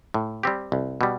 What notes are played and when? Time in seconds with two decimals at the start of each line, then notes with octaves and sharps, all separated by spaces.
0.14 A2
0.43 G3 C4 G4
0.72 C2
1.01 B2 G3